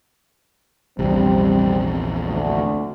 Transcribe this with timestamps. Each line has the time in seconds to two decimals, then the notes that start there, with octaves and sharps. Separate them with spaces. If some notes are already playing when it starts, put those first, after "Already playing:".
0.99 A#1 E2 C3 G3 C4
2.26 D2